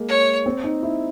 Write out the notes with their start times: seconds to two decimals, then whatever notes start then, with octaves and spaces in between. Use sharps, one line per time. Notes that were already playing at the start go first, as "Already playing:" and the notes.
Already playing: G#3 A#3
0.08 C#5
0.46 C4
0.64 D#4
0.83 E4